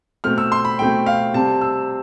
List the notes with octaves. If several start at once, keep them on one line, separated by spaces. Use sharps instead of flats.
B2 A3 C4 F6
E6
C6
B5
B2 A3 C4 G5
F5
C3 G3 C4 A5
E6